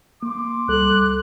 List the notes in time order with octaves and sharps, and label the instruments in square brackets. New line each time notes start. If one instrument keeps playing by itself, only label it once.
[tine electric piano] A#3 [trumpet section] C6 D6
[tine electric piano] C#2 G3 A4 [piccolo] F#6